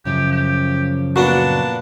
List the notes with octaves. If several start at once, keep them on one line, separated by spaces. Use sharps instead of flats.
F#2 C#3 F3 G4
G4
A#2 B3 D4 F#4 A5